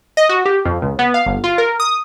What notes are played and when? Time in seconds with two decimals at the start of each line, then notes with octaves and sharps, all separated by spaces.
0.17 D#5
0.29 F#4
0.46 G4
0.65 F2
0.82 C#2
0.99 B3
1.14 F5
1.26 G1
1.44 F4
1.58 A#4
1.80 D#6